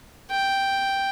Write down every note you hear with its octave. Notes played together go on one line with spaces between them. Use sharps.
G5